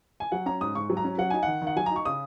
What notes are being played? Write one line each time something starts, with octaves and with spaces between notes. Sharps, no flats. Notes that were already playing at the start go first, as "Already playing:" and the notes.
G#5
F#3 F#5
C#4 A#5
G#2 D#6
G#2 C#6
F#3
A#5
C#4
F#3 F#5
D#4 G#5
D#3 F#5
D#3
F#5
F#3 G#5
D#4 A#5
C#6
C#3 D#6